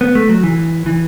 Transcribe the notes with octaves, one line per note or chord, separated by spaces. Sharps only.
B3
A3
F#3
E3
E3